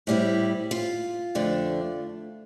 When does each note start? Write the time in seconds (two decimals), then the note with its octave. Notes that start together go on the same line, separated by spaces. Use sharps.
0.07 A2 G3 C4 E4
0.71 F4
1.35 F2 D3 A3 D4